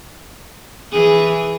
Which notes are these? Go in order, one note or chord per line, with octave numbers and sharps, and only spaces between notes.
E3 G#4